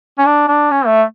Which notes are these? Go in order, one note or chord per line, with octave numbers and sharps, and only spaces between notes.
C#4
D4
D4
C#4
A3